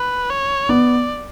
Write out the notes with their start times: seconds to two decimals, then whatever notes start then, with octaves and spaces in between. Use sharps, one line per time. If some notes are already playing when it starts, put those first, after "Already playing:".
Already playing: B4
0.30 C#5
0.69 B3 D5